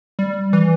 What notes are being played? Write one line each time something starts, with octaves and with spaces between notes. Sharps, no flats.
G3
E3